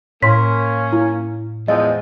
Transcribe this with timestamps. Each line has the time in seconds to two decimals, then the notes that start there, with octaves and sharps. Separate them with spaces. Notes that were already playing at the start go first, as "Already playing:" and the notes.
0.23 A2 A#3 C#4 C6 B6
0.93 E4
1.68 E2 F3 G#3 D#5